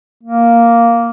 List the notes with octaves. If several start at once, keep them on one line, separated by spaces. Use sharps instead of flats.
A#3